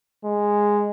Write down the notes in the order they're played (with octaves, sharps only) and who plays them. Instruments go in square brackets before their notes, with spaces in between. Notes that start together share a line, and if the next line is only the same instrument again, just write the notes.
[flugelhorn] G#3